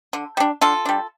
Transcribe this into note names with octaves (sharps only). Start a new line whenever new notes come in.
D3
G3 D4
D3 F4 A4
G3 D4